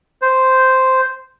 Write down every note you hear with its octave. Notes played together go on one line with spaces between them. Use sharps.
C5